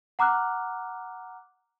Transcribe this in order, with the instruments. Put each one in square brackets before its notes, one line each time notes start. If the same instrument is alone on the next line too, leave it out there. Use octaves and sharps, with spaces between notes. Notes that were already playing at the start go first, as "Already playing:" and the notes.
[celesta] F#5 A#5 D6 F6 F#6